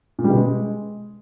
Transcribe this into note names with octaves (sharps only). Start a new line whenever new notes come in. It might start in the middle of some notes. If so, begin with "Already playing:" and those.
A#2
G3
B2
G#3